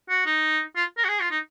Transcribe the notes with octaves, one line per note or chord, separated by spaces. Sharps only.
F#4
D#4
F4
A#4
F#4
G#4
F4
D#4